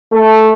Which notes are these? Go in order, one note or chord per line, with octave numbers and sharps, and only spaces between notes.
A3